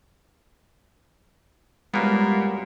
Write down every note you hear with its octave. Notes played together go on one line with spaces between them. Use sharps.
F#2 A#2 G3 G#3 A#3 B3 B5